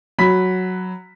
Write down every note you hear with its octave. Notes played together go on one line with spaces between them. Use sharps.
F#3 B5 B6